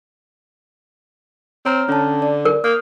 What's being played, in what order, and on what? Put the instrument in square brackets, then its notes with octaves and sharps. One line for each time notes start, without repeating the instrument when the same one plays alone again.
[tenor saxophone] C4 [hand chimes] C#5 A#5 F6
[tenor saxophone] D3 [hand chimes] C#4 A5
[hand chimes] D5
[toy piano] A#4
[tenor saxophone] A#3 [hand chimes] D#6 F6 G6